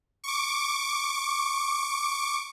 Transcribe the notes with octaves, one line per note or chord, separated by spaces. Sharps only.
C#6 D6